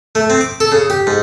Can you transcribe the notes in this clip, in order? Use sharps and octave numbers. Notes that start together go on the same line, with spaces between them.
A3
C4
D6
A4
C#3
G4
G#2